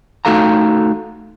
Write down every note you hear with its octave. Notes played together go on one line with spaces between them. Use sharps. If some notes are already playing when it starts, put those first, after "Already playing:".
A3 D#4 F#4 A4 F5 A#5